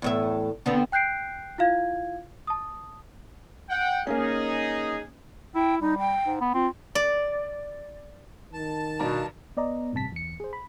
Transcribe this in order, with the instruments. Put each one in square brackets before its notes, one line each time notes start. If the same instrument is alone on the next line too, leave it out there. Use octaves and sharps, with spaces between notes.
[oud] E2 A2 E5
D3 B3 C4
[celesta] G5 F#6 G6 C7 D7
E4 F4 F5 G#6
A5 D#6
[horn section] F#5 G5
[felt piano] A#3 C#4 [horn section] D#4 G#4
[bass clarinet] E4 [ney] G5
[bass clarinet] G3 [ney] D#4
[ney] G5
[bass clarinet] G#2
B3
[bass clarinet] C4 [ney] F4
[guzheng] D5
[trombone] D#3 [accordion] A5
[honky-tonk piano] G2 D5 A#5 [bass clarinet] B2
[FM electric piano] B3 D5 D#5 A#5
A1 G2 C3 A5 B6
E2 C#7
G#4 C5
B5